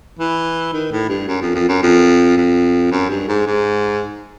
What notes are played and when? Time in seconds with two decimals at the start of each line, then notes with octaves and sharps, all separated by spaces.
0.19 E3
0.73 D#3
0.92 A2
1.09 G2
1.28 F#2
1.42 F2
1.55 F2
1.69 F#2
1.82 F2
2.37 F2
2.92 F#2
3.10 G2
3.28 G#2
3.47 G#2